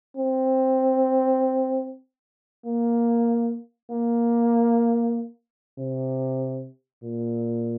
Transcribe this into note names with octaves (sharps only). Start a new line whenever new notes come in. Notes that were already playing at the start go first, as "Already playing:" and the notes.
C4
A#3
A#3
C3
A#2